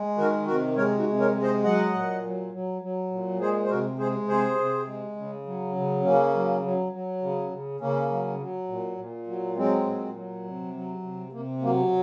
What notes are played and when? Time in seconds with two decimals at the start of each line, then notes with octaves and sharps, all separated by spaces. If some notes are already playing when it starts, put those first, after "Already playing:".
Already playing: G#3
0.18 D#3 F#4 A#4
0.47 C3 F#4 A#4
0.77 G#3 A#4 C#5
0.98 D#4 F#4
1.06 C3
1.20 A#4 C#5
1.35 G#3
1.42 C5 D#5
1.64 F#3 D#5 F#5
1.94 A#2
2.23 F#3
2.52 F#3
2.82 F#3
3.11 A#2
3.40 G#3 G#4 C5
3.64 C5
3.70 C3 F#4 A#4
3.99 G#3 G#4 C5
4.28 C3 G#4 C5
4.58 C3
4.87 G#3
5.16 C#3
5.46 F#3
5.76 C#3
6.04 C#3 A#3 C#4
6.34 F#3
6.63 F#3
6.92 F#3
7.21 C#3
7.51 C#3
7.80 C#3 A#3 C#4
8.10 F#3
8.39 F#3
8.68 A#2
8.97 A#2
9.27 F#3
9.56 F#3 G#3 C4
9.86 A#2
10.15 F#3
10.44 C3
10.74 F#3
11.03 C3
11.32 C3 A#3
11.62 F#3 A#3